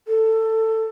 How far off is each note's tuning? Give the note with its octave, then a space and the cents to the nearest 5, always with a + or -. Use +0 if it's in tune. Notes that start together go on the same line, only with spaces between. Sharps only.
A4 +15